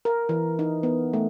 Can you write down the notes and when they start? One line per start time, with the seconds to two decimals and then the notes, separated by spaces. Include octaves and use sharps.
0.05 A#4
0.29 E3
0.59 D#4
0.83 B3
1.13 A3